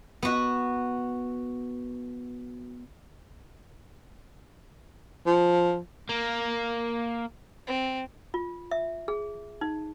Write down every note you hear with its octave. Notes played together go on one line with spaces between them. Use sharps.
B3 F#4
F3
A#3
C4
F4
E5
G#4
D#4